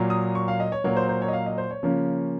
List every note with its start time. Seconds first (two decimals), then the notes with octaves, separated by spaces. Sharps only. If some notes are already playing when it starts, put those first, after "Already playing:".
Already playing: A#2 F#3 A#3
0.10 D#6
0.35 C#6
0.48 F5
0.60 D#5
0.72 C#5
0.84 A#2 F#3 A#3 C#5
0.96 C5
1.09 C5
1.22 C#5
1.28 D#5
1.33 F5
1.46 D#5
1.58 C5
1.71 C#5
1.83 C#3 F3 A#3 C#4